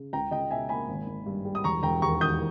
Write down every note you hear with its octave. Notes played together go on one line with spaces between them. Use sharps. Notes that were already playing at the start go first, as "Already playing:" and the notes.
Already playing: C#3
C#2 G5 A#5
C#2 D#5 G5
B2 E5 G#5
A#3 G#5 B5
G#1
G#1
G2
G3
D#6
E1 A#5 C#6
E1 G5 A#5
D#2 A#5 C#6
D#3 D#6 G6